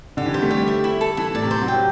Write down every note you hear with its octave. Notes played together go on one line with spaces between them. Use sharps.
D3 G4
E3
G3 C5
A3
G3 G4
E5
E4
A4
E3 E4
A2 D5
C3
C5
F#3
G3 G5